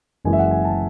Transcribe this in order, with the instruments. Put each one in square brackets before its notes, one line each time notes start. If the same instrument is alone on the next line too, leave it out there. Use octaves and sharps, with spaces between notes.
[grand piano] F#1 F#2 E3 G#3 G#5
E5
F#5
G#5
A5